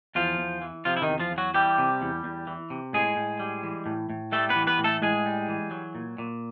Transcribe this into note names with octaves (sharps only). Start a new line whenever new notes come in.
E2 F3 F4
E2
E3
C3 F3 F4
E4
D#3 D#4
E2
F3 F4
E2
F#3 F#4
E3 G3 G4
C3
E2
E2
E3
C3
A2 G#3 G#4
A2
G3
E3
A2
A2
G3 A3 A4
B3 B4
E3
B3 B4
A2
A3 A4
A2 G#3 G#4
G3
E3
F#3
A#2
A#2